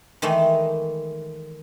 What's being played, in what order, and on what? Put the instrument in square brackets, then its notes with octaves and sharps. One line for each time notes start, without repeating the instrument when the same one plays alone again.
[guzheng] D#3 E3 G#3 A3